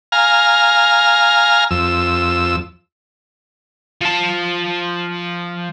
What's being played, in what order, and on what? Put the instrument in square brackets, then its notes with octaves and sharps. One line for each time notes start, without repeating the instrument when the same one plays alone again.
[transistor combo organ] F5 G#5 A#5 F6
F2 E6
[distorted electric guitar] F3 A5